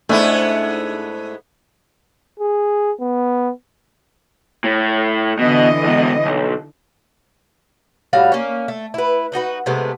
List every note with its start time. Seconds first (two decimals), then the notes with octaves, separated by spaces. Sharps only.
0.09 G#2 A3 B3 D4 E4 G#5
2.39 G#4
3.00 B3
4.64 A2
5.39 B2 D3 E3 D#5
5.84 E2 B2
6.25 B1
8.13 A2 G3 F#4 F5
8.32 A#3 C#4
8.68 A3
8.94 E4 B4
9.32 D4 D#4 F#4 B4
9.66 C3 G#3 A3 B3